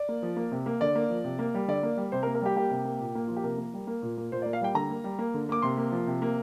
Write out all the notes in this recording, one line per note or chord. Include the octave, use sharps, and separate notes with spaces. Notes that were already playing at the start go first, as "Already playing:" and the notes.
Already playing: D5
A#3
F3
A#3
C3
A#3
D3 D5
A#3
F3
C3
A#3
G3
D3 D5
A#3
G3
C3 C5
A#4
A#3
A#4
G3 G4
A#3 G4
C3
A#3
A#2
A#3
F3 F4
G4
C3 A#4
A#3
G3
A#3
A#2
A#3
A#2 C5
D5
A#3
F5
G3 G5
D3 A#5
A#3
G3
A#3
D3
A#3 D6
C3 C6
A#3
F3
C3
A#3